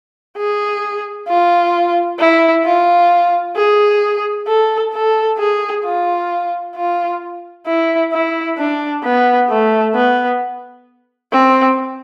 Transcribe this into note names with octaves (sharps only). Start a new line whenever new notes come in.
G#4
F4
E4
F4
G#4
A4
A4
G#4
F4
F4
E4
E4
D4
B3
A3
B3
C4